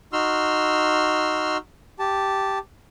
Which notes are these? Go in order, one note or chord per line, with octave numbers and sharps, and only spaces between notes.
D#4 F#4 C6 E6 F6
G4 A5